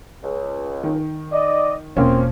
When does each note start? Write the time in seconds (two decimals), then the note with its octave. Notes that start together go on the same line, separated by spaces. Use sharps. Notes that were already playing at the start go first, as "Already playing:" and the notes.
0.23 C#2
0.83 D#3
1.32 D5 D#5
1.97 E1 F3 A#3 C4 C#4